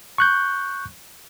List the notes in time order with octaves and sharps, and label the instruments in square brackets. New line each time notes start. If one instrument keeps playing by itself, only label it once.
[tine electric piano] C#6 F#6 G6